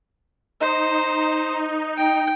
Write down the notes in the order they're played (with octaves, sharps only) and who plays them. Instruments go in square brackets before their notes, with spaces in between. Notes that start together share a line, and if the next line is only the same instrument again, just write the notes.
[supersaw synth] D#4 [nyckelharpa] C5
[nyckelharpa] G5